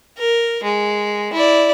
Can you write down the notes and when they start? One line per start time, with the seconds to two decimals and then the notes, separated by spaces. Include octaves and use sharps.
0.18 A#4
0.64 G#3
1.34 E4 D5